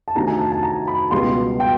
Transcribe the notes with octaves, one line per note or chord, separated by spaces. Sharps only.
A5
D2 C3 D#3 A#5
G#5
A5
A5
A#5
B5
C#2 B2 G3 B3 C6
G5